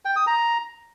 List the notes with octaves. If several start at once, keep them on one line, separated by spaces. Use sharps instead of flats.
G5
D#6
A#5